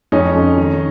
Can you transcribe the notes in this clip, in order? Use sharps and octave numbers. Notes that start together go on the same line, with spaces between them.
F2 C#4 D#4
F2
D#3